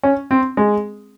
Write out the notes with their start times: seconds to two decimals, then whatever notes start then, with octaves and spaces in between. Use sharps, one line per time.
0.03 C#4
0.31 C4
0.57 G#3